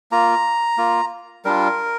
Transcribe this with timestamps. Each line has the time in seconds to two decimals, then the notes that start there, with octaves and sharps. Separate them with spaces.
0.11 A#3 F4 A#5
0.77 A#3 F4
1.45 G3 D4 F4 A#4